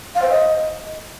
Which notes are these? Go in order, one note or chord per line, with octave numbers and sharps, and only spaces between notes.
F5
C5
D#5